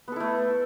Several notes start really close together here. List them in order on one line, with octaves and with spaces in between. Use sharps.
B3 A4 E4 A3